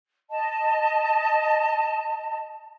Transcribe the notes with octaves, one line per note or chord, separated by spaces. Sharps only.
D#5 A5